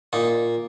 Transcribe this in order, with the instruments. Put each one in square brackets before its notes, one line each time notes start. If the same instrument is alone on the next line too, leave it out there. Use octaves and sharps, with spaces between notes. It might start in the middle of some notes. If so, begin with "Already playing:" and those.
[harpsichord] A#2 D#4